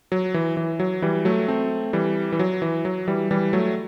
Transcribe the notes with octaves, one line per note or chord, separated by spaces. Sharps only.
F#3
E3
E3
F#3
E3 G3
F#3 A3
A3 C4
E3 G3
E3
F#3
E3
F#3
E3 G3
E3 G3
F#3 A3